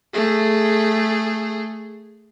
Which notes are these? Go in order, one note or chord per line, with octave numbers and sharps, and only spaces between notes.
A3 G#4